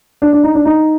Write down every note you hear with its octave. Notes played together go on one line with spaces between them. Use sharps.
D4
D4
D#4
D4
D#4